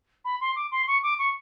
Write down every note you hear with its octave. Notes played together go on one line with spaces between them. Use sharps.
B5
C6
D6
C6
C#6
D6
C#6